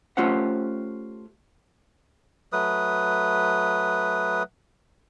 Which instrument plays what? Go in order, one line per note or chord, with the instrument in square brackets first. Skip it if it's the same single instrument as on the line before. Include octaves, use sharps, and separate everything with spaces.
[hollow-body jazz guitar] A3 C#4 F4 G4 C5 F#5
[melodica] F#3 A3 B4 D#6